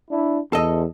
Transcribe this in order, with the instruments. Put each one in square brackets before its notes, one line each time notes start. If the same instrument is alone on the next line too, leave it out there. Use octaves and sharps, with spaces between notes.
[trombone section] D4 E4
[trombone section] E2 [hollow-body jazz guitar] A4 D#5